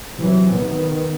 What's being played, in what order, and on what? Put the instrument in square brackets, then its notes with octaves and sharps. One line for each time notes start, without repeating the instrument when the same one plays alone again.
[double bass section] C3 E3 F#3
D#3 B3